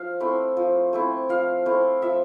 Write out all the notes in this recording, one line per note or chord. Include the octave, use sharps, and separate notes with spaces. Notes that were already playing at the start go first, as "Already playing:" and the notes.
Already playing: F3 F5
A3 C4 E4
F3
A3 C4 E4
F3 F5
A3 C4 E4
F3 E5